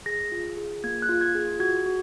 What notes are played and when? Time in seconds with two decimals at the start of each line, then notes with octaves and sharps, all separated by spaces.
0.06 G#4 A#6
0.32 F4
0.57 G#4
0.84 A#3 G#6
1.02 F#6
1.09 F4
1.21 G#6
1.35 G#4
1.60 F#4 G#6
1.86 F#4